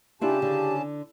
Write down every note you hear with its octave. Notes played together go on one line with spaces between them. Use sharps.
C#3 C#4 D4 E4 F4 G4 A5
D3